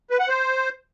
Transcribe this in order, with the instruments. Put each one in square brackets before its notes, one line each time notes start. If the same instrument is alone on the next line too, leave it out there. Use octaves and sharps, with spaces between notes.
[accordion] B4
F#5
C5